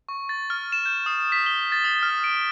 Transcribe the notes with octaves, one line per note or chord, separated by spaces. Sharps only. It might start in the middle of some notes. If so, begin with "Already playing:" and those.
C#6
A6
F6
E7
G6
D#6
B6
G7
A6
D#6
F6
D7